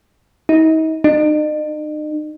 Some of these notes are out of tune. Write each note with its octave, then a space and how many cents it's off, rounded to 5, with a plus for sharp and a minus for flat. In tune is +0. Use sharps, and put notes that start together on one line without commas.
D#4 +40
D#4 -40